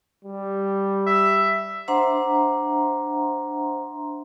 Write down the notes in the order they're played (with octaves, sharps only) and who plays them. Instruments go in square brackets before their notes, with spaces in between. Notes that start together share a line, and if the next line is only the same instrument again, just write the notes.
[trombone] G3
[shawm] E5
[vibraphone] D4 C5 E5 F#5 A#5 C6